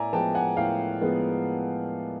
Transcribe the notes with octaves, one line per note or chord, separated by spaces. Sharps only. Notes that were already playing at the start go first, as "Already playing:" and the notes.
Already playing: A2 D5 E5 G#5 A#5
F3 G#3 B3 G5 A5
F#5 G#5
A2 F5 G5
F3 G#3 B3